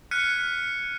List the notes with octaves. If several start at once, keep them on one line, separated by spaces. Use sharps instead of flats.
F6 F#6 G#6 B6 C#7 D#7